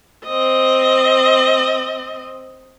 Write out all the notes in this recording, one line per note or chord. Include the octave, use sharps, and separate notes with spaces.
C4 D#5